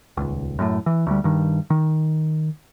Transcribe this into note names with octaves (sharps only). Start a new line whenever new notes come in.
D#1 C#2
F#2 A2
E3
D2 G3
G2 D#3
D#3